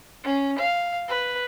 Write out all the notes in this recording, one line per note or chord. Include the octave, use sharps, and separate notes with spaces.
C#4
F5
B4